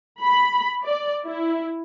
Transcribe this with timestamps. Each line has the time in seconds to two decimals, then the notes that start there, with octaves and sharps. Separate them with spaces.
0.23 B5
0.85 D5
1.26 E4